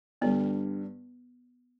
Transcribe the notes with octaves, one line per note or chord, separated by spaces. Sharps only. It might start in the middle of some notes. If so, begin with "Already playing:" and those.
G2 D3 G3 B3